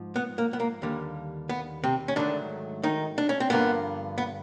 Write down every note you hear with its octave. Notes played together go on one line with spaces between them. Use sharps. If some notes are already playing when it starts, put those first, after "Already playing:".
Already playing: G#2 F3
B3
A#3
B3
A#3
D#2 D3 G3 A#3
B3
C3 C4
C#4
G#2 D3 D#3 F#3 A3 D4
D#3 D#4
D4
C#4
C4
G2 D3 F3 A#3 B3
B3